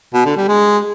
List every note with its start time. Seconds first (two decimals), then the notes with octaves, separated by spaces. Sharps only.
0.14 B2
0.26 D3
0.37 G3
0.48 G#3